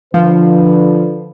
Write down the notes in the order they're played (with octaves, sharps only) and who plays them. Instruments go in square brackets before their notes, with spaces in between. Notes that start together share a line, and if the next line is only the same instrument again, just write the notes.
[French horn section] D3 B4 [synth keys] F3